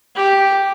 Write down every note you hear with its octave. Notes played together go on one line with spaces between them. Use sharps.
G4